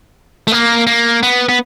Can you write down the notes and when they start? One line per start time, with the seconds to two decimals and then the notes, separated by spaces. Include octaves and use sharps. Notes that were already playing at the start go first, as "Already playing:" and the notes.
0.47 A3
0.52 A#3
0.87 A#3
1.23 B3
1.49 B3